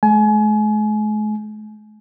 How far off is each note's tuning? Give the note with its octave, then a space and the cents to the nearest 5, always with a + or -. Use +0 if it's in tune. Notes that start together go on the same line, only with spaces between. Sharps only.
G#3 +45 G#5 +30